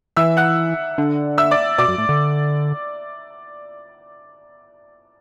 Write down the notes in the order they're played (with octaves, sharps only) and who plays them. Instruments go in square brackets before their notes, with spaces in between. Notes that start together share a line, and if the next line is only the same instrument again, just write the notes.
[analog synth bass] E3 [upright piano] E5 E6
[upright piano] F#5 F#6
[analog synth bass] D3
[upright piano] E5 E6
D5 D6
[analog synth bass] B2 [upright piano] D5 D6
[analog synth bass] F#2
A2
D3